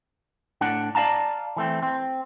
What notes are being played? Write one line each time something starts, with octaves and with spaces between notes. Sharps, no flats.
A2 D4 F#5
D5 D#5 F5 A5 A#5
E3 A3 C4
C4